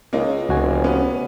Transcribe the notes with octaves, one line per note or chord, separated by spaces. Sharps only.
C#2 A#3 D#4
F1 C#2 F#4 G#5
B3 C#4